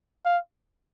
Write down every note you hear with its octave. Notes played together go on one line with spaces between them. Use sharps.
F5